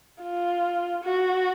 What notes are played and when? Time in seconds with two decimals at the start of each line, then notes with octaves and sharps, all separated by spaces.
0.23 F4
1.04 F#4